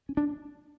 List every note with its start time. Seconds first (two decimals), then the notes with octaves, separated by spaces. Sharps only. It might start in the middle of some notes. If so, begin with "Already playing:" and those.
0.09 C#4
0.17 D4